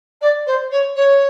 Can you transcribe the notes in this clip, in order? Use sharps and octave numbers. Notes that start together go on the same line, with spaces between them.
D5
C5
C#5
C#5